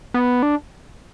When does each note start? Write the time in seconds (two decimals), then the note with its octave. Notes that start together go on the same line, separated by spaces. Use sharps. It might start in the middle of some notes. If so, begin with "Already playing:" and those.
0.14 B3
0.43 D4